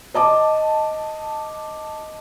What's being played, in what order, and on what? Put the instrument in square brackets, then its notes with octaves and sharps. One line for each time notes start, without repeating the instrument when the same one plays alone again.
[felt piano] D#5 A5 D6